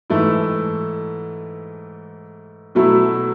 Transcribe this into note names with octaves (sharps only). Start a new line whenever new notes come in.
G#2 E3 A3 E4
B2 F#3 A3 E4